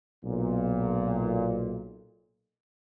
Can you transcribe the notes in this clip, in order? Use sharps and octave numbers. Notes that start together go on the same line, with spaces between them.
B1 A#2